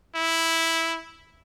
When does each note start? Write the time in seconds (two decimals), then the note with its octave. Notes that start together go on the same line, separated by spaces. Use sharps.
0.15 E4